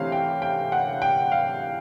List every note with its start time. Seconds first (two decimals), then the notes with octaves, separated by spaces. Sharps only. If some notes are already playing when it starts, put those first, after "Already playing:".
Already playing: C3 E3 A3 C4 C#5 F5
0.12 G5
0.42 G5
0.72 F#5
1.02 G5
1.32 F5